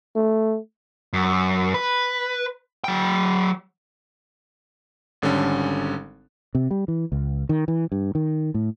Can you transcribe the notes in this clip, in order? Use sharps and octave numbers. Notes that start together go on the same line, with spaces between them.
A3
F#2
B4
F#3 G5
G#1 D3 G3 C#4 A4
C3
G3
E3
C#2
D#3
E3
G2
D#3
A2